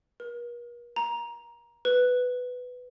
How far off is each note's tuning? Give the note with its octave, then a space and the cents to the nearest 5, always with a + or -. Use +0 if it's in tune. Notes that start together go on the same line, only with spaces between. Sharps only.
A#4 +45
A#5 +15
B4 +10